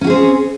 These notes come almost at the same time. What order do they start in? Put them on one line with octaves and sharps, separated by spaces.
C#4 F#4 G#4 C4